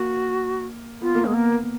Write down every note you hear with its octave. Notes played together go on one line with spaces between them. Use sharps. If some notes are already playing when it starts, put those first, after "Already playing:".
Already playing: A#3 F#4
B3 F4
A#3
G#3 B3
A#3